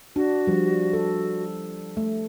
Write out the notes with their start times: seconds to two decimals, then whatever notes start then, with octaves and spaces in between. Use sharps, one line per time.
0.16 D4 F#4
0.47 F3 G3
0.93 A4
1.97 A3